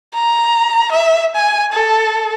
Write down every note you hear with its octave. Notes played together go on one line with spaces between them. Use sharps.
A#5
E5
G#5
A4